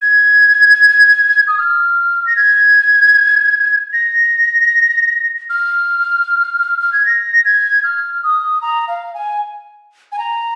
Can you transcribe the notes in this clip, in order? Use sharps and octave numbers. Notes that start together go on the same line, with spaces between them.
G#6
D#6
F6
A#6
G#6
A#6
F6
F6
G#6
A#6
G#6
F6
D#6
A#5
F5
G#5
G#5
A#5